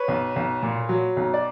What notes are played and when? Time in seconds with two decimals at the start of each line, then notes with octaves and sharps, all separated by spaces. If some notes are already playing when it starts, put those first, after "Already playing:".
Already playing: B4 C#5
0.08 B1
0.36 B1
0.63 A#2
0.89 F#3
1.17 B1
1.34 D5